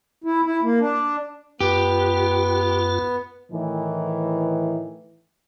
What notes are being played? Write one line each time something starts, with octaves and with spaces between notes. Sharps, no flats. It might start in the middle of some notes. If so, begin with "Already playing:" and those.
E4
E4
A#3
D4
F#2 B3 F4 G4
A2 D#3 E3